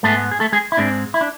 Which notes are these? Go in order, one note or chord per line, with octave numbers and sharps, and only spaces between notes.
G#2 G#3 A3 B3 A4
G#4
A3 A4
G#3 G#4
E4
G#2 G#3 C4 D4
E4
D4